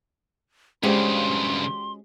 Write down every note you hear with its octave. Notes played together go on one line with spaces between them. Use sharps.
G2 C#3 G#3 C#4 F#4 G4 C5 C6